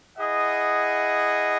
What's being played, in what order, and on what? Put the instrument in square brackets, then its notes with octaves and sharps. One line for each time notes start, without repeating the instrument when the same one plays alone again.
[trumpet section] E4 G#4 D#5 F#5